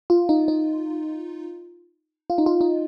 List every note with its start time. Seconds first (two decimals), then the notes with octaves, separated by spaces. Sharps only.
0.10 F4
0.29 D#4
0.48 D#4
2.30 F4
2.38 D#4
2.46 F4
2.61 D#4